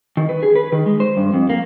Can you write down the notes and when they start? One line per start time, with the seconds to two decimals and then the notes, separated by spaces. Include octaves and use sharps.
0.17 D#3
0.29 B4
0.43 G#4
0.56 B4
0.72 D#3
0.86 G#3
1.00 C5
1.17 G2
1.34 F2
1.50 A#3